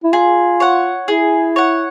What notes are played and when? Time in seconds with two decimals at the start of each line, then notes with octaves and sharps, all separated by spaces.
0.04 E4
0.13 F4 G#4
0.60 C#5 F#5
1.08 E4 G#4
1.56 C#5 F#5